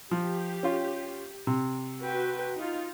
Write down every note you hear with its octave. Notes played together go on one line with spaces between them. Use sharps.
F3 G4
C#4 F4
C3
F#4 B4 G5
D#4 F4